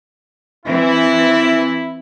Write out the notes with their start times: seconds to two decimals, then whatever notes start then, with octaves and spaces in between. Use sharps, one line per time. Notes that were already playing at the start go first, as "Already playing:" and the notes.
0.66 E3 C4 E4